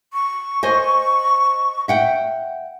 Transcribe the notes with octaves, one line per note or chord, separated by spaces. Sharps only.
C#6
C5 D#5 G#5
E5 F#5 G5